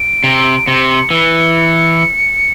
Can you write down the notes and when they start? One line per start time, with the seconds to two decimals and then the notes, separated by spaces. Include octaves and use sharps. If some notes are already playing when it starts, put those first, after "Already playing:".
Already playing: D7
0.24 C3
0.66 C3 C#7
1.11 E3